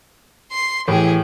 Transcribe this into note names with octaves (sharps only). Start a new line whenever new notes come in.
C6 C7
A2 E3 G4 G#4